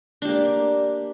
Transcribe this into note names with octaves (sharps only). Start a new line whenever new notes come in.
A#3 D4 G4